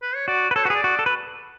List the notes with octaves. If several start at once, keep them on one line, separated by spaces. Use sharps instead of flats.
B4
C#5
F#4 D5
B4
A4 C#5
F#4 B4
G#4 D5
F#4
A4
B4